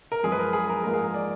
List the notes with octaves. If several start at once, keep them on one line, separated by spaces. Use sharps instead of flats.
A#4
F#2 F3 G#3 G#4
B4
A#4
G#4
A#4
G#2 F3 A#3 A#4
G#4
A#4
D5